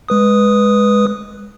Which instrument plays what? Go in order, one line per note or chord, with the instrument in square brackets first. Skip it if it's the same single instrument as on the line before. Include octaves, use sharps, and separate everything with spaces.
[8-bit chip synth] G#3 B4 D#6